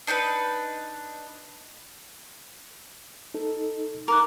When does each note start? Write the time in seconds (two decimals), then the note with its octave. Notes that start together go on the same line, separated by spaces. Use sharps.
0.07 D4 D#4 A4 B4
3.34 D#4 A4
4.08 D#4 A#4 D6 F#6